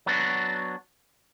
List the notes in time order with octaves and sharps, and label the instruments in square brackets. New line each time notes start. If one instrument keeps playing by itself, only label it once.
[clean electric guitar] F#3 B3 D4 F#4